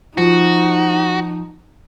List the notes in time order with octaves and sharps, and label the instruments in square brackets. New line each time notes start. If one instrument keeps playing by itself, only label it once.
[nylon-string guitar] F3 [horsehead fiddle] D#4 [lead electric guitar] F#4